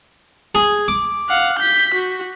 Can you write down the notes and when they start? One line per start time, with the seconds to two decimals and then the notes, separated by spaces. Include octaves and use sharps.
0.55 G#4
0.88 D6
1.29 F5 F#5
1.59 G6 B6
1.94 F#4